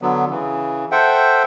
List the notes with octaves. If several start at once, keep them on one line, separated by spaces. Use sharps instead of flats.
D3 F#3 B3
C#3 E3
A4 C5 E5 F#5 G5